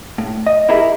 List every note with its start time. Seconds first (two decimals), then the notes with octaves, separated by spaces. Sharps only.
0.18 A2
0.46 D#5
0.69 E4 G4 G#4 A#4 D#5 E5